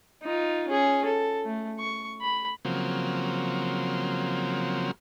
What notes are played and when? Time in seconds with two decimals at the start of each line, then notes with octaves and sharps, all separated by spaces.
0.23 D#4 F4
0.68 C#4 G#4
1.05 A4
1.45 A3
1.80 C#6
2.22 B5
2.65 C#3 F3 F#3 A#3 C4